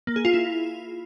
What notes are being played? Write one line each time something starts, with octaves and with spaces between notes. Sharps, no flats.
A#3
G#4
F4
E4